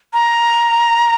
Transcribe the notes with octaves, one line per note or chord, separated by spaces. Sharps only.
A#5